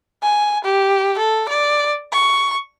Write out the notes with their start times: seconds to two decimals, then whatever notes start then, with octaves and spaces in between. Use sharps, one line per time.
0.23 G#5
0.64 G4
1.18 A4
1.48 D5
2.12 C#6